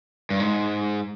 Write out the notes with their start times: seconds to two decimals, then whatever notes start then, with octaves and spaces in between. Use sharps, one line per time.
0.30 G2
0.40 G#2